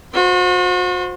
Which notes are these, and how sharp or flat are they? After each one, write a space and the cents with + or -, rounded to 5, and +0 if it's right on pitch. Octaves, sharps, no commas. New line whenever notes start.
F#4 -40 C5 +0